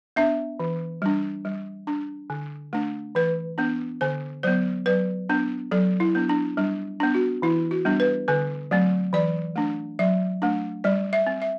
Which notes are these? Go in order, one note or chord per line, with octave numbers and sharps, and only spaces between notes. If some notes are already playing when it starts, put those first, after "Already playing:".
B3 D4 E5
E3
G3 D4
G3
D4
D3
A3 D4
E3 B4
B3 D4
D3 C5
F#3 B3 C5
F#3 B4
B3 D4
F#3 A4
E4
B3 D4
D4
G3 D4
B3 D4
F#4
E3 E4
F#4
G3 B3 D4
B4
D3 B4
F#3 A3 C4
E3 D5
A3 D4
F#3 E5
A3 D4
G3 D5
E5
C4
E5